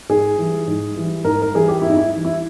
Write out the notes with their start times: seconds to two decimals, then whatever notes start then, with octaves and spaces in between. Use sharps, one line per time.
0.09 G#2 G#4
0.38 E3 G3
0.68 G#2
0.96 E3 G3
1.24 G#2 A#4
1.42 A#4
1.54 E3 G3 G#4
1.68 G4
1.82 G#2 E4
1.90 D#4
1.96 E4
2.11 E3 G3
2.25 E4